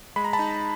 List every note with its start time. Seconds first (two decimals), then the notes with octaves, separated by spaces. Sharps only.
0.16 G#3 B5
0.25 A#5
0.33 A5 B5
0.39 D#4